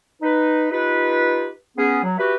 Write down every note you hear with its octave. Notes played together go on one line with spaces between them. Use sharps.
D#4 B4
D#4 F4 G4 B4
B3 C#4 G#4
F#3
E4 F#4 G4 B4